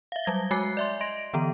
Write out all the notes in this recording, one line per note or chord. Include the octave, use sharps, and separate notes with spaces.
E5 F5
F#3 G3 G#6 A#6 G7
G#3 F#4 G#5 D6 F#6 C7
D5 E5 C6
D#5 C6 A#6 D7
D3 E3 B3 A#5